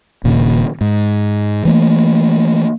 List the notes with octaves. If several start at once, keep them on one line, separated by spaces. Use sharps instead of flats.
D#1 D#2 A#2 C#3
G#2
E3 A3 A#3